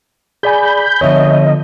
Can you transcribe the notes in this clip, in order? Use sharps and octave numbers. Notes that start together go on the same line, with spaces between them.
G#4 D5 G#5 B5 G6
D3 F3 B3 C#5 D#5 E5